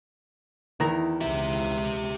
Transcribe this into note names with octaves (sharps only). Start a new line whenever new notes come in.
E2 D#3 E4 A#5
C#2 G4 E5